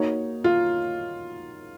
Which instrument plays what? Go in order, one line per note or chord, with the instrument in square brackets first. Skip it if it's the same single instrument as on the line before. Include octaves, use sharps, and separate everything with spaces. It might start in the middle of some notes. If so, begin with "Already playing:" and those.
Already playing: [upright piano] A#3 D#4 F#4 C#5
[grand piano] F4